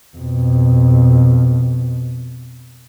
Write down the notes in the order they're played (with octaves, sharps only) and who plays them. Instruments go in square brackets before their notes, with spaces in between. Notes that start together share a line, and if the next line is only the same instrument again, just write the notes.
[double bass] F2 B2